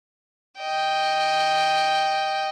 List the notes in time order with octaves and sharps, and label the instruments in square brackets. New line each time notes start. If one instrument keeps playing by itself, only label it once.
[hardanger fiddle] D#5 G5